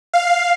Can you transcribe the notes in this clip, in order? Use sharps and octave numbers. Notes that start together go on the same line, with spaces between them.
F5